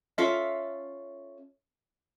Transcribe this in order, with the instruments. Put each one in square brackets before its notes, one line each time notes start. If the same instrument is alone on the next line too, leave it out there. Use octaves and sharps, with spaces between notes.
[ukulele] C#4 F4 A4 E5